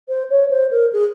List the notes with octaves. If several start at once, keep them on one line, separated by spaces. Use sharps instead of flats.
C5
C#5
C5
A#4
G#4